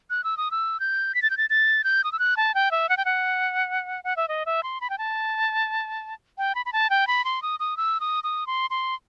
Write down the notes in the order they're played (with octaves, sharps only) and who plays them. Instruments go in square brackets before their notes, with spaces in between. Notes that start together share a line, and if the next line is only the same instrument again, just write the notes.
[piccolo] F#6
E6
D#6
E6
G6
B6
A6
G6
A6
A6
G6
D#6
E6
F#6
A5
G5
E5
F#5
G5
F#5
F#5
E5
D#5
E5
C6
B5
G5
A5
G5
B5
B5
A5
G5
B5
C6
D#6
D#6
E6
D#6
D#6
C6
C6